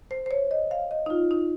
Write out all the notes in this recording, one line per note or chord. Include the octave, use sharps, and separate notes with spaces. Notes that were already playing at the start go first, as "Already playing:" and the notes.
C5
C5
C#5
D#5
F5
D#5
D#4
F4
D#4